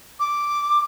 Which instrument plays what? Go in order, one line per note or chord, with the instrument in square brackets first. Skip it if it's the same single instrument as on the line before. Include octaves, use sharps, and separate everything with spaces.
[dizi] D6